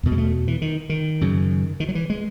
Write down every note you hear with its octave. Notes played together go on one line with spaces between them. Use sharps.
E2 B2
G#3
A3
E3
D#3
D#3
F#2 C#3
D#3
F#3
E3
G#3